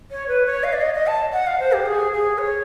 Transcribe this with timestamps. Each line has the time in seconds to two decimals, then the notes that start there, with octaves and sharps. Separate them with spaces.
0.11 C#5
0.28 B4
0.46 C#5
0.64 F5
0.73 D5
0.81 D#5
0.94 D#5
1.07 A5
1.33 F#5
1.47 F5
1.60 C5
1.73 G4
1.86 G#4
2.13 G#4
2.38 C#5